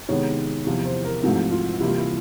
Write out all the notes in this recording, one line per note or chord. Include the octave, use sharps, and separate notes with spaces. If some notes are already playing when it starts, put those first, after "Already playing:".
C3 D#3 G#3 B3 C#5
E2 C3 F3
C5
A#4
G#2 F3 A3 C4 F#4
F4
C3 E3 G3 A#3 E4
F4
E4